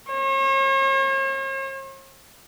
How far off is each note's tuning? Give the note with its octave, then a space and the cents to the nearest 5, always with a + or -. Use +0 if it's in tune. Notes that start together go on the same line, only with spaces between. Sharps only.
C#5 -45